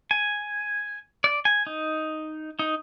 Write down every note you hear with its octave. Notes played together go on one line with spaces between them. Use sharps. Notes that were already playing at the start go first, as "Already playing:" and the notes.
G#5
D5
G#5
D#4
D#4